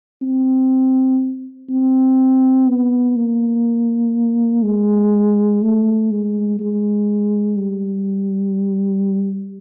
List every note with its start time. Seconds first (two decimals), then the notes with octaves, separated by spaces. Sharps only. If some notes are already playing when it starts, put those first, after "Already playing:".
0.22 C4
1.70 C4
2.67 B3
3.16 A#3
4.63 G#3
5.62 A3
6.11 G#3
6.59 G#3
7.57 G3